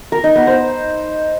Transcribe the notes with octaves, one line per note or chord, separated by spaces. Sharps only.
A#4
D#4
B3
C5